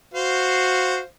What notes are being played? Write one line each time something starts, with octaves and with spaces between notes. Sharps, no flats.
F#4 C5 F5